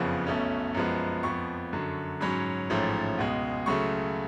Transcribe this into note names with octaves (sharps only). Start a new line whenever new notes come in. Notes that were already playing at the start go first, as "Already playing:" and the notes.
Already playing: F#1 F2 C#3 F3 B3
B1 B2 A3 C#4
F#2 F3 G#3 B3
F2 F3 B3 C#6
F#2 D3 F#3
G#2 F#3 C#4 B5
A1 G#2 F3 A3 C#4
C#2 B2 G#3
C#2 C#3 F#3 A3 C#6